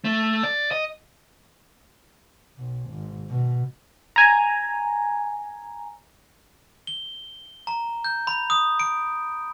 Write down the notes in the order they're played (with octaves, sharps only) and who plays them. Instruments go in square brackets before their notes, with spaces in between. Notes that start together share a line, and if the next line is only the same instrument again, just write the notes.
[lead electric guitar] A3
D5
D#5
[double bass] B1
G#1
B2
[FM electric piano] G#5 A#5
[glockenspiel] G7
A#5
G6
B5
D#6
D7